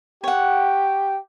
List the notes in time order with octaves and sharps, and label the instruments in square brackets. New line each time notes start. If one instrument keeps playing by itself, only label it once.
[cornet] G4 [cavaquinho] C#5 F#5